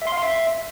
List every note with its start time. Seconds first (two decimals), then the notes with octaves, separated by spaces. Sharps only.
0.02 E5
0.07 C6
0.12 F5
0.17 C6
0.23 E5